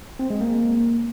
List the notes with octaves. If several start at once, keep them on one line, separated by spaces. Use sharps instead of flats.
C4
G#3
A#3